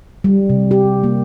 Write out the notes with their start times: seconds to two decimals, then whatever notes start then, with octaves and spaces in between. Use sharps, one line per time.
0.24 G3
0.49 C3
0.71 G4
1.04 A#3